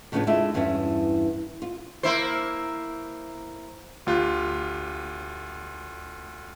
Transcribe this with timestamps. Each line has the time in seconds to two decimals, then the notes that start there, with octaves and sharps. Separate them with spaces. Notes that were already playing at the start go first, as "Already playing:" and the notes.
0.12 A2 C#3 F3 A#3 B3 D4
0.27 G#3 A3 D4 E4 F4 E5
0.54 E2 G2 E3 C#4 E4
1.62 F4
2.03 A#3 E4 C5
4.07 D2 F4 G4 F#6